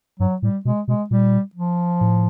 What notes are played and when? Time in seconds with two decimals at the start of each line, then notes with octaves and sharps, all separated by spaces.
0.20 G2 F#3
0.42 A2 G3
0.65 B2 G#3
0.87 B2 G#3
1.10 A#2 G3
1.55 F3
2.01 A2